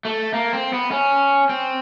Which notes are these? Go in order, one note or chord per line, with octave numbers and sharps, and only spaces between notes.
A3
A#3
C4
B3
C#4
C4